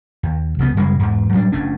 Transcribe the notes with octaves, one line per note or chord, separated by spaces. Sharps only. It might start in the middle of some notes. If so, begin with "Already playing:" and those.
D#2
C2 C#3 F#3 B3
F#2 C#3 G3 G#3
E2 G#2
A2 F#3 G3 D4
F#1 A3 C#4 D4